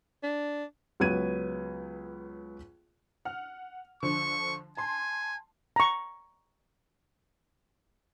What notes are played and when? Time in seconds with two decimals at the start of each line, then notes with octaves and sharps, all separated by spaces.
0.23 D4
1.00 C#2 F#3 B3 B4 G#6 D#7
3.25 F#5 F6
4.03 D3 F3 D4 C#6
4.77 G#5 A5 C6
5.76 A#5 C#6